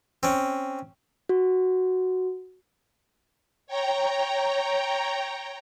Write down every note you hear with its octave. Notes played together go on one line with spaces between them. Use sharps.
C4 C#4
F#4
C#5 G5 A#5